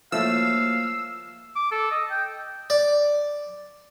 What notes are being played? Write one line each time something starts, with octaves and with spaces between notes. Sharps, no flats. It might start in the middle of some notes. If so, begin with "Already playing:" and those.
F3 F#3 A3 A#3 E4 F5 E6
D6
A4
D#5
G5
D5